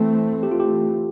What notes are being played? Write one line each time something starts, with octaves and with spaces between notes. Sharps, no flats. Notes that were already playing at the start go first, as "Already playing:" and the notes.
Already playing: E3 A3 C4
G4
F4
G4